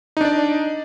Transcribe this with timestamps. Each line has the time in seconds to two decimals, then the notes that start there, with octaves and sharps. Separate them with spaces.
0.17 D#4
0.21 D4
0.25 D5